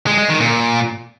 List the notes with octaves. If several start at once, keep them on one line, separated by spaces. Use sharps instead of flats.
G#3
G#3
D#3
A#2